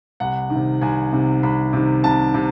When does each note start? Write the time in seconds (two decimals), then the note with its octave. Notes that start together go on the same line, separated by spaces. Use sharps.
0.20 C2 F#5
0.50 D#3
0.55 C3
0.81 C2 G#5
1.11 C3 D#3
1.43 C2 B5
1.73 C3 D#3
2.04 C2 A5
2.34 C3